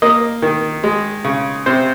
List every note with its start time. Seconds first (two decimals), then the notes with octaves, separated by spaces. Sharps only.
0.02 A#3 D#5
0.42 D#3
0.84 G#3
1.24 C#3
1.66 C3 C5